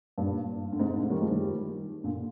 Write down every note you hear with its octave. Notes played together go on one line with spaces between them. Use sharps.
G2 A#2
D3
G#2 C3
A#2 D3
D#3 G3
F3 G#3
D#3 G3
A#2 D3